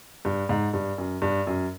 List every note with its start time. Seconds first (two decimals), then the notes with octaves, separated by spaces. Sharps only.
0.25 G2
0.49 G#2
0.73 G2
0.98 F#2
1.22 G2
1.47 F#2